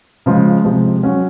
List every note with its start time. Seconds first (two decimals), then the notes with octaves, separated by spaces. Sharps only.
0.26 C#3 F3 G#3
0.64 C3 F3 G#3
1.03 F#3 C#4 F#4